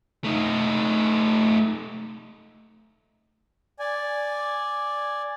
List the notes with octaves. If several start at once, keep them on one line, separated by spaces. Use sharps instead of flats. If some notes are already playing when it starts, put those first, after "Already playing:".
A3 D#4
D5 G#5